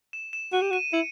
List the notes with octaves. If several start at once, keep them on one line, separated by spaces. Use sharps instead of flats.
E7
E7
F#4 D#7
G4
F#4 D#7
E4 C#7